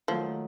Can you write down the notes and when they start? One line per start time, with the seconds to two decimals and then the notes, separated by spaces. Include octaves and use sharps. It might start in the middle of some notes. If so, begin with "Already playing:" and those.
0.08 D#3 F3 F#3 A3